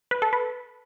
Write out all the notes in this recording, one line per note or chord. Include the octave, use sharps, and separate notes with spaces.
B4
A4
B4